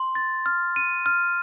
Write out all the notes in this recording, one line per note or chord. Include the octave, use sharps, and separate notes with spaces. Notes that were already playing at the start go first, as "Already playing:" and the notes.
Already playing: C6
A6
F6
D#7
F6